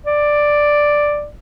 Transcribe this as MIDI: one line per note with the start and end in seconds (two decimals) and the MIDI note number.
0.07 1.27 74